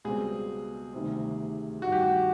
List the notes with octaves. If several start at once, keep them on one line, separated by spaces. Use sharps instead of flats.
C#2 B2 G3 C4 G#4
D2 C3 D#3 G3 C4
A1 G2 D#3 F#4
G4
F#4